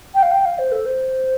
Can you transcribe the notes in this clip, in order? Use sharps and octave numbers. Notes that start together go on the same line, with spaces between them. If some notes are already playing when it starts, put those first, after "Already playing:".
G5
F5
G5
F5
C5
A4
C5